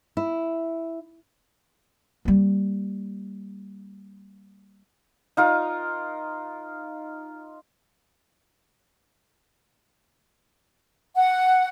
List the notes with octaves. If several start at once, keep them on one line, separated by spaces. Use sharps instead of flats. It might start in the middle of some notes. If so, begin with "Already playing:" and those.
E4
G3 A#3
D#4 F4 A#4
F#5